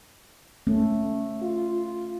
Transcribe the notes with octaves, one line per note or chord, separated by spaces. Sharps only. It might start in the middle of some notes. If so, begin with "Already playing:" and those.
A3 C#4
F4